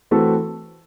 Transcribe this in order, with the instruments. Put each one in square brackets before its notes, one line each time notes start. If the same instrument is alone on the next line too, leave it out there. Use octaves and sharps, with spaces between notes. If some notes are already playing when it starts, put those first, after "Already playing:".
[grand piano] E3 A3 C4 F#4 A4